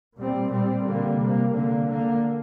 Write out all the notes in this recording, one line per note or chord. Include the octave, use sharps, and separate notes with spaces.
A#2 G3 C4
A#2 G3 C4
D3 G3 A#3
C3 A#3
D3 A#3
D3 A#3